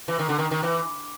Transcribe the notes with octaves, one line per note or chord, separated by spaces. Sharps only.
E3
D#3
D3
D#3
D#3
E3